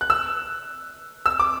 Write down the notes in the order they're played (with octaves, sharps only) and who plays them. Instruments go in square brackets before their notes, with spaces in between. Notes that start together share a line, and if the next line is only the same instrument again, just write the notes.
[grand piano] F#6
E6
E6
D6